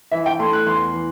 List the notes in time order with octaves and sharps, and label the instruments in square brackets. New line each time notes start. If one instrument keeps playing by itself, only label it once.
[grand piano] E3 [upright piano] E5
[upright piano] G5
[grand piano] A3 [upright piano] C6
[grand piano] E4
[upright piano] F#6
[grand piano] E2 [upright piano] C6
[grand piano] E3